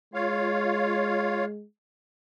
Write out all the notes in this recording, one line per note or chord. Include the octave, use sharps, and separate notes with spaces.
G#3 F4 C#5 F5